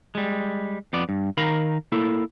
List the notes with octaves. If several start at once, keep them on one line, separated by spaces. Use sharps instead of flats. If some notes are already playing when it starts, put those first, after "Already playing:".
G3 G#3
F2 B3 D5
G2
D#3 A#4 F5 A#5 B5
A#3 E4 A4